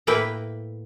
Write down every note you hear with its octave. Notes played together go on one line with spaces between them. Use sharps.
A2 A#3 E4 B4 G5